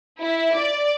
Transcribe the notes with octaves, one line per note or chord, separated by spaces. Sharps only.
E4
D5